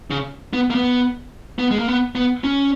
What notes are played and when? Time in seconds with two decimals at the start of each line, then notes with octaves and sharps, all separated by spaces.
0.10 C#3
0.53 B3
0.70 A#3
0.75 B3
1.59 B3
1.71 G#3
1.79 A#3
1.88 B3
2.15 B3
2.44 C#4